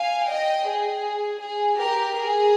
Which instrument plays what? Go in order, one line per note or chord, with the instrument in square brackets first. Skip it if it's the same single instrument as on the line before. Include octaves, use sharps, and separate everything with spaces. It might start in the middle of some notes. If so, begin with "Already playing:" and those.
Already playing: [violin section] F5 G#5
D#5 G5
G#4
G#4
G4 A#4
G#4